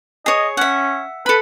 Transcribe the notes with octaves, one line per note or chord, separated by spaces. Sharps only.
G#4 C#5 D#5
C#4 E5 F#5
A4 B4 B5